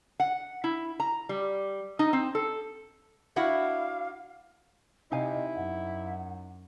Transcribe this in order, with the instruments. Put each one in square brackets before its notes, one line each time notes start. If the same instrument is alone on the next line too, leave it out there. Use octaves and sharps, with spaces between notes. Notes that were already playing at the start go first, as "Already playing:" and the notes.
[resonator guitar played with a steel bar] F#5
E4
A#5
G3
D#4
C4
A4
[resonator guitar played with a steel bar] D4 E4 F#4 [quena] F5
[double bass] C3 [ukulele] D#4 F5 G#5 [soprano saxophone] E4 [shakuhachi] D#5
[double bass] F#2 [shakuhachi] F#5